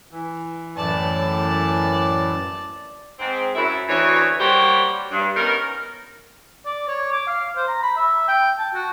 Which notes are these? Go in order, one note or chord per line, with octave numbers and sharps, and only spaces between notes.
E3
F#2 A2 E3 D5 A5
G#2 C4
F#2 E4
D2 E3 C#5
G3 A#3 F#4 G4 C5 C#5
G2
B3 C#4 D#4 A#4
D5
C#5
D6
F5
C5
A#5
B5
E5
G5
A5
F#4